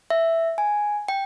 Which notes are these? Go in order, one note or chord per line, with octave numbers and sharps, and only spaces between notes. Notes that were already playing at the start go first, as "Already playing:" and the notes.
E5
G#5
G5